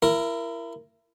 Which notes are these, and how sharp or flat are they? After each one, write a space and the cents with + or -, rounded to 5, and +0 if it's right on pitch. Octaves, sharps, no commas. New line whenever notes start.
E4 +30 A#4 +0